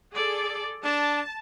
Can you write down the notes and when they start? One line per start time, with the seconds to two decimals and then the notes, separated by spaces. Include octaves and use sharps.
0.13 G#4 A4 D5
0.84 D4 A5